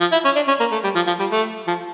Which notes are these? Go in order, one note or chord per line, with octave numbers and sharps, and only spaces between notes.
F3
E4
C#4
D4
C#4
A#3
A3
G3
F3
F3
G3
A3
F3